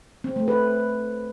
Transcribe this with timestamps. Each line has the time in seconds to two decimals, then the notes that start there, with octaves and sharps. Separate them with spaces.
0.24 C4
0.36 A3
0.48 B4